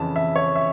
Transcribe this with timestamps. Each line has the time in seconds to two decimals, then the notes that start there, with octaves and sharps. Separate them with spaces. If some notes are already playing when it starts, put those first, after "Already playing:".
Already playing: F2 C#3 E3 A5
0.16 E5
0.36 C#5
0.56 E5